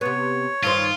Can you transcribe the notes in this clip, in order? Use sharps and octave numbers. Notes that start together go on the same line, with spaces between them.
C3 B3 C#5
G2 D#3 F4 C5